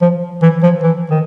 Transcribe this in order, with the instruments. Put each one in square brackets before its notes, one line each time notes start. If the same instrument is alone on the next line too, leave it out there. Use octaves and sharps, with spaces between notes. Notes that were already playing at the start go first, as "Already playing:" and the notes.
[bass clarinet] F3
E3
F3
E3
D#3